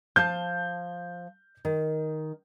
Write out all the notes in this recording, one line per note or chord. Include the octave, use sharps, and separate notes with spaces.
F3 F5 A5 G6
D#3